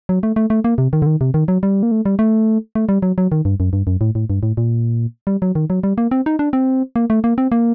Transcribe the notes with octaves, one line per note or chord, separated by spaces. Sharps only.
F#3
A3
A3
A3
A#3
C3
D#3
D3
D#3
C3
D#3
F#3
G3
A#3
A3
G3
A3
A3
G3
F#3
F#3
D#3
G2
F#2
G2
F#2
A2
A2
G2
A2
A#2
G3
F#3
D#3
F#3
G3
A#3
C4
D#4
D4
C4
A#3
A3
A#3
C4
A#3